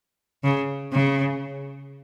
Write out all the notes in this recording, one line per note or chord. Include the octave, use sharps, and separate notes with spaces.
C#3
C#3